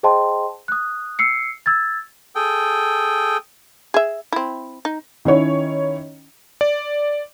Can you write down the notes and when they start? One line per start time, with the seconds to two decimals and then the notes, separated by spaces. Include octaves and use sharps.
0.03 G#4 C5 D#5 G5 A5 C6
0.68 D#6 F#6
1.19 E6 C7 C#7
1.66 E6 G#6 A6
2.36 G#4 A4 G5
3.94 G#4 E5
4.32 C4 E4
4.85 D#4
5.25 D#3 C#4 E4 C#5
6.61 D5